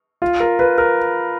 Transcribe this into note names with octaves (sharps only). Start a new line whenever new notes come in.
F4
A#4
B4
A#4